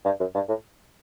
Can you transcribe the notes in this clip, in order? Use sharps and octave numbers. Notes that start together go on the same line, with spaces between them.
G2
F#2
G2
A2